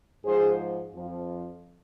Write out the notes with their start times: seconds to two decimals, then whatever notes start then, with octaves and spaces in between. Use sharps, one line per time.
0.25 G#2 F3 G#4 C5
0.94 F2 F3